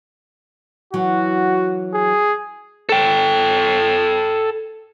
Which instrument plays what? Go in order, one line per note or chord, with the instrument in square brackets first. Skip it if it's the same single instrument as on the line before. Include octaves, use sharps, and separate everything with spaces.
[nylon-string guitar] E3 F#3 [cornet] F#4
[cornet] G#4
[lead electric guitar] A4 G5